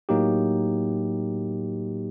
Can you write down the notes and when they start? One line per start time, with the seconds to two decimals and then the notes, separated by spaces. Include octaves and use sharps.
0.09 A2 F#3 A#3 D#4 G4